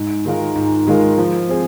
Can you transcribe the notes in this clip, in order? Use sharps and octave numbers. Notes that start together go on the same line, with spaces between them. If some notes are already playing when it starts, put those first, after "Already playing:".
Already playing: G#2
D#3 G#3 F4 A#4
G#2
D#3 G#3 F4 A#4
F3
C4 G#4